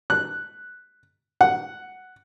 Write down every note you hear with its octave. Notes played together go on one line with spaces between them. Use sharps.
F#6
F#5